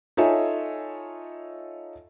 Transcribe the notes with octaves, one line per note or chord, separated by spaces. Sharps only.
D#4 F4 A4 C#5 E5 G#5